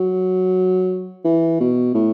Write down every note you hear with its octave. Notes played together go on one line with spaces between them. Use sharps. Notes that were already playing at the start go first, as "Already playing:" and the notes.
Already playing: F#3
E3
B2
A2